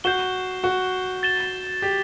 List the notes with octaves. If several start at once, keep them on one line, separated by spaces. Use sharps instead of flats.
F#4 G6 C7 E7 G7
F#4
A6 E7 G7
G4